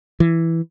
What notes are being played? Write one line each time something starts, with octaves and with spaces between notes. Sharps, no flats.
E3